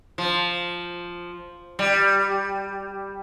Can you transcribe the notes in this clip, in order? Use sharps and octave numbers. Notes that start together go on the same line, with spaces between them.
F3
G3